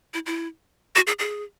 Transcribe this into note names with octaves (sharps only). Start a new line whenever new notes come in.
E4
E4
F#4
G#4
G#4